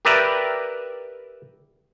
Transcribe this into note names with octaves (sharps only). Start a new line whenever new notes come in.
G4 A#4 B4 D5 E5